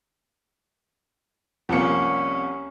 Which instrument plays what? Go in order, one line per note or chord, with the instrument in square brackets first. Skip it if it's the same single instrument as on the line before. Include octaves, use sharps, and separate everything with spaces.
[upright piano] C2 C#7 [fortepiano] F3 A#3 [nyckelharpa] C#4